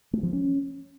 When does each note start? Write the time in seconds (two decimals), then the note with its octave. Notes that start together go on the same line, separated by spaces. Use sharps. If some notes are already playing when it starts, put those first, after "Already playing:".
0.13 A3
0.23 F3
0.33 C#4